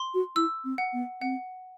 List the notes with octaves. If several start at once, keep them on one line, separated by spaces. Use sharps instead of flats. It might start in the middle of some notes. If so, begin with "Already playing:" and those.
Already playing: C6
F#4
E4 E6
C4
F#5
B3
C4 F#5